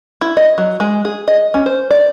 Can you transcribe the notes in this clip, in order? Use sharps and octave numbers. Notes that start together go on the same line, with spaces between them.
E4
D#5
F#3
G#3
G#4
D#5
C#4
C5
D5